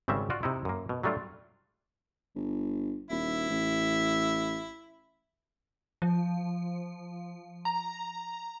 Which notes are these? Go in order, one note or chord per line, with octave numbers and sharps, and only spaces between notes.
G#1 C#3 G3 C4 E5
F4 F#4 D5
C3 D#4 E4
F#2 A#3
B2
F#3 G3 A3 D4 F4
G1
D#1 E4
A1
F3
A#5